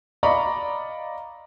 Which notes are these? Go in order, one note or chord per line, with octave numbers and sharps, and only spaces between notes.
D5 D#5 F5 A#5 B5 C#6